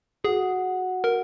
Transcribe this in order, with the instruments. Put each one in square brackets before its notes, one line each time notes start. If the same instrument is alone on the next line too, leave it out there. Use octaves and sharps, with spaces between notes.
[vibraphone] F#4 F#5 [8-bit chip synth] G#4
[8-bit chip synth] A#4